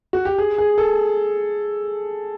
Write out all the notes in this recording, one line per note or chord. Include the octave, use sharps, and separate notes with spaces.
F#4
G4
G#4
G#4
A4